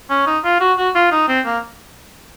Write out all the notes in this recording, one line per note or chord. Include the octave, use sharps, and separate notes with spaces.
C#4
D#4
F4
F#4
F#4
F4
D#4
C4
A#3